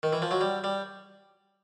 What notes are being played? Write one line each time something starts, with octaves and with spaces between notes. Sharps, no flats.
D#3
E3
F3
F#3
G3
G3